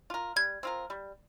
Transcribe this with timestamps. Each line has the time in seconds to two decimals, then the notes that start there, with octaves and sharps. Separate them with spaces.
0.10 F4 A#4
0.36 G3 G#6
0.63 C4 F4 A#4
0.90 G3